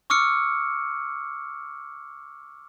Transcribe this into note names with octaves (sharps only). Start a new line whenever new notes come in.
C#6 D6 E6 F6 C#7